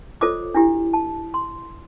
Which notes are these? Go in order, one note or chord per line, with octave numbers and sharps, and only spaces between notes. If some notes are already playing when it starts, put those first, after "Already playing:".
F4 A4 C5 C#5 D#5 D6
D4 E4 G4
A5
C6